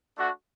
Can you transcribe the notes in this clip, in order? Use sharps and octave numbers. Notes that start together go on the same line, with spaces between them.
A3 D4 F#4